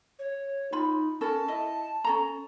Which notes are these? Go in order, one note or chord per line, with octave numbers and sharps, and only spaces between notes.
C#5
D#4 F4 B5
C#4 A4 A#4 A5
E4 D#5
C#4 A4 A#5